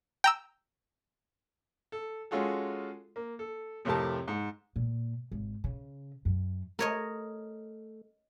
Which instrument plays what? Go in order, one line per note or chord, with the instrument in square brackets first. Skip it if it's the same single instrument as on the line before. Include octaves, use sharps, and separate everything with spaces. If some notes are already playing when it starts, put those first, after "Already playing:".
[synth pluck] G5 A#5 E6
[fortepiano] A4
G#3 C#4 F4 F#4 G#4 A4
A#3
A4
F2 A2 C3 G4 A#4 A5
G#2
[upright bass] A#2
G#1
C#3
F#2
[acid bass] A3 [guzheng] A#4 C#5 D#5